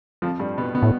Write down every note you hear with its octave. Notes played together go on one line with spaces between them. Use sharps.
F2 F3
G2 G3
B2 B3
B2 B3
A2